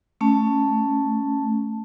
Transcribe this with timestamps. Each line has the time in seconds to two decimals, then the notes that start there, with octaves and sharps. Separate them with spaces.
0.21 A3 C#4 A5